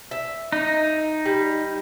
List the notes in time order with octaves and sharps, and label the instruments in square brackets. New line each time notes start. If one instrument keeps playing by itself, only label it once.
[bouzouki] E5
[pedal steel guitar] D#4
[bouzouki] G3